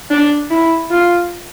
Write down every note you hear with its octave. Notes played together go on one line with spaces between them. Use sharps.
D4
E4
F4